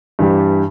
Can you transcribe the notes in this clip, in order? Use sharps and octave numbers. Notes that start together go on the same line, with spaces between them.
G2 E3 G3